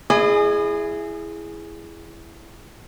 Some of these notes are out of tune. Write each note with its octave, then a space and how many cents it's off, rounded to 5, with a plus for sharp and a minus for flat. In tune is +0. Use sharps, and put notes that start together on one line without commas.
E4 +15 G#4 +0 D#5 -35